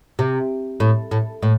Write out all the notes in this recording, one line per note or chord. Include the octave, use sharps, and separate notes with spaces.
C3
A2
A2
A2